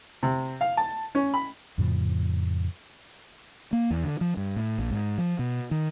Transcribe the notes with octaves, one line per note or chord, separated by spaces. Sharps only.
C3
F5
A5
C#4
B5
F2 A2 C#3 F3
A#3
E2
D3
F3
G2
A2
A#1
G#2
F3
B2
D#3